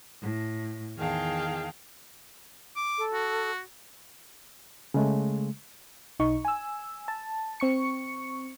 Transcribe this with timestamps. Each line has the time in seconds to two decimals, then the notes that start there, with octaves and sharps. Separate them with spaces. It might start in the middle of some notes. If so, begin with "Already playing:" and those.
0.22 A2
0.98 E2 D#3 G#4 F5 G5 A5
2.76 D6
2.98 A4
3.13 F#4
4.94 C#3 G#3 A3
6.20 B1 D#4 C#6
6.45 G#5 E6
7.08 A5
7.60 C4 C#6 C#7